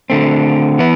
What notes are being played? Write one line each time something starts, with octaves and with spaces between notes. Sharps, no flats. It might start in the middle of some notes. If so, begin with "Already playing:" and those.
D3 A3 C4
E3 B3 E4 B4